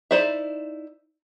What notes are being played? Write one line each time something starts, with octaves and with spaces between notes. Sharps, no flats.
D#4 E4 C5 D5 E5